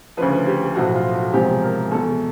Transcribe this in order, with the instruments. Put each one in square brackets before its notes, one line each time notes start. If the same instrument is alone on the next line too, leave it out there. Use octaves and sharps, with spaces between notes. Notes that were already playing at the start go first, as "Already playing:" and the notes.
[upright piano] D2 C#3 F3 B4
G4
B1 A2 F3 F#4
F4
F#4
E1 E2 C3 F3 G4
A#4
E2 B2 A4